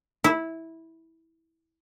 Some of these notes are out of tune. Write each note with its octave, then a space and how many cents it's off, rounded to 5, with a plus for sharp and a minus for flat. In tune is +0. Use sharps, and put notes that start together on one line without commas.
E4 -15